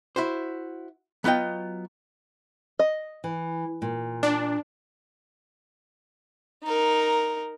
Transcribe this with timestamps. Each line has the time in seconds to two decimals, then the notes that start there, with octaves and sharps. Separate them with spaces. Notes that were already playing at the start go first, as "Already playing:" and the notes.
0.16 E4 F#4 C5
1.24 F#3 B3 F4 D#5 G5
2.79 D#5
3.24 E3
3.82 A#2
4.23 D4
6.64 D#4 A#4